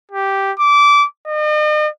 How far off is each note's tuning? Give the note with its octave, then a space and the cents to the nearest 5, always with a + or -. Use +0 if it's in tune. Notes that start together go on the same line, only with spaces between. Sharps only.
G4 -5
D6 -20
D#5 -40